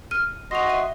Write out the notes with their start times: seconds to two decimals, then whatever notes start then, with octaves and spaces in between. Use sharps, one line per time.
0.11 F6 D#7
0.51 F#4 D#5 C6 A#6 F7
0.67 E5 D#7